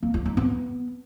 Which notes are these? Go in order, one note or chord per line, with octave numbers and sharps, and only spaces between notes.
A#3
F4
D#4
B3